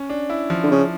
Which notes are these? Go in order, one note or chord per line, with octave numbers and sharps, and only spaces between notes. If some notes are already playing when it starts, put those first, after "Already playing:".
Already playing: C#4
D4
E4
F3
D3
C#3